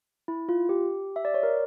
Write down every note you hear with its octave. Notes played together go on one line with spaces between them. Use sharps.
E4
F4
G4
E5
D5
C#5
A#4